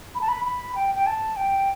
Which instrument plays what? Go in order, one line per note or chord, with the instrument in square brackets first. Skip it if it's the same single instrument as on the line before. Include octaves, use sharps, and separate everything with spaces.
[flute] B5
A5
B5
B5
G5
G5
A5
G5